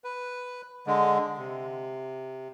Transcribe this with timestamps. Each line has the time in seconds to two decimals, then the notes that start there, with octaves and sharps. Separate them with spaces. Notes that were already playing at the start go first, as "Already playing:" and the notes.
0.04 B4
0.87 D3 G#3
1.38 C3